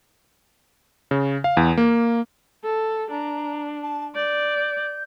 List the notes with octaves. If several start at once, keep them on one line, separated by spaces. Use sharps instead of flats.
C#3
F5
E2
A#3
A4
D4 A#5
A5
D5 G6